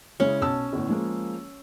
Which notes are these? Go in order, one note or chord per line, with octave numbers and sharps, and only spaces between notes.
C#3 G#3 C#4 E4
B1 A5 E6
G1 A2
F3 G#3 A#3